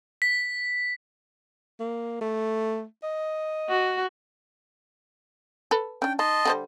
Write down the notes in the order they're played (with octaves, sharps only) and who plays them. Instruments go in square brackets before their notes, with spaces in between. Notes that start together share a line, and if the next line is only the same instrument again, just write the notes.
[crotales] B6
[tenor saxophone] A#3
A3
D#5
[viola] F#4
[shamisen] A4 B4
[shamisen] C#4 D4 [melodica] G5
[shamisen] D#4 [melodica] D#5 A5 C6
[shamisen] D3 G3 C5